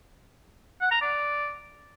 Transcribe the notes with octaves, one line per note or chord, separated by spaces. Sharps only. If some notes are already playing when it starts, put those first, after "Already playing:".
F#5
A#5
D5